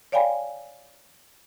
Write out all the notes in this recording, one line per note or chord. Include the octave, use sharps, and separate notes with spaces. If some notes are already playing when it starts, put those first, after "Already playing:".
C#5 D5 F5 G5 G#5 B5